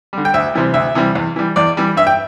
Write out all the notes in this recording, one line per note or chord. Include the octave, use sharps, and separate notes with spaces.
D3 G3
G5
D2 E5
C3 E3 G3
D2 E5
C3 E3 G3
E2
E3 G3
E2 D5
E3 G3
G2 E5
G5